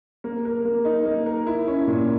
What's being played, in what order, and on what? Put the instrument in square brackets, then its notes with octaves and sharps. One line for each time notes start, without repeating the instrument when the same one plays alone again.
[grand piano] A#3
A#4
A#3
D#4
A#3
A#4
E4
C#4
A#2